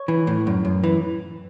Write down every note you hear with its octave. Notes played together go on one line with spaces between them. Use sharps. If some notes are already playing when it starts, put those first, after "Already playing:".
Already playing: C#5
E3
A2
F#2
F#2
E3